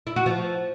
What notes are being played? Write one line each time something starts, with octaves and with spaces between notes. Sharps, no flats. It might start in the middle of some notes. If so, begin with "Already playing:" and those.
E4
F#4
F3